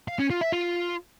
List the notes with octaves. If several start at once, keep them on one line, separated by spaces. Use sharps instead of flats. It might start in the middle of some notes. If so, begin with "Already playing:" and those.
F5
C#4
F4
E5
F4